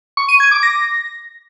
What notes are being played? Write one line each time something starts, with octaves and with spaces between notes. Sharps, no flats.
C#6
D#7
G#6
D6
A#6